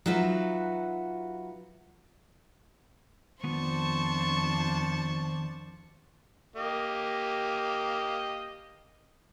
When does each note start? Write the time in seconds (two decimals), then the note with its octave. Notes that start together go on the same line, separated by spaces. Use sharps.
0.06 F#3 D#4 F4 F#4 B4 E5
3.44 F2 D#3 B3 D4 F4 C5 A5 C#6
6.56 A#3 G4 D#5